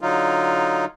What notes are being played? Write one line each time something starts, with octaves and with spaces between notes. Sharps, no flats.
D3 F#3 D#4 F4